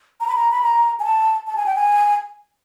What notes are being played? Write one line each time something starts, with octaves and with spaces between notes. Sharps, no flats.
A#5
B5
A#5
B5
A#5
G#5
A5
A5
G#5
G5
G#5